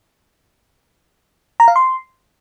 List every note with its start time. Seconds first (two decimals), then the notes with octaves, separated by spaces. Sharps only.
1.60 A#5
1.68 F5
1.76 C6